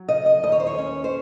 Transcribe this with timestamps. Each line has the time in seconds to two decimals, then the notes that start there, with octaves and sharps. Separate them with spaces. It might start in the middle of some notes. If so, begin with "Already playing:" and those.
Already playing: F#3
0.08 C#3 D#5
0.26 D#5
0.43 D#2 D#5
0.52 C#5
0.60 C5
0.67 C#5
0.78 C#4
1.04 C5